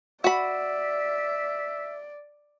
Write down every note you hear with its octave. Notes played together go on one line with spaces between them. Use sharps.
F#4 D5 E5 B5